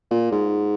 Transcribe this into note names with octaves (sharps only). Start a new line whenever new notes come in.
A#2
G#2